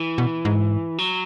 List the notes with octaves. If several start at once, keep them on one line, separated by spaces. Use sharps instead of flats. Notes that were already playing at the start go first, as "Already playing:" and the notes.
Already playing: E3
B2
G#2
F#3